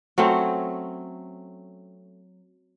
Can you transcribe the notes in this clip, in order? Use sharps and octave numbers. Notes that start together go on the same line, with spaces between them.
F#3 A3 C4 C#4